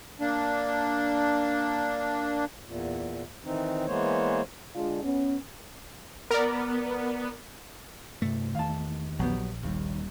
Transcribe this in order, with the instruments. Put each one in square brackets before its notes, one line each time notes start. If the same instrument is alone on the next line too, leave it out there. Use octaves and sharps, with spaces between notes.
[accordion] A#3 D4
[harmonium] E2 A#2
D#3 E3 C4 D#4
E3 G#3 A#3 B3 C5 C#5
[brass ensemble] D3 G#3 D4 F4
B3 C#4
[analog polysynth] B3 [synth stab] A#4 D5
[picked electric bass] G2 C3 [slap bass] A3
[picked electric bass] E2 D#3 [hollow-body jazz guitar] F5 A5
[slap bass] A#1 [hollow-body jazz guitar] F#3 B3 G4
[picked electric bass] D#1 G3 [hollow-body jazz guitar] D#2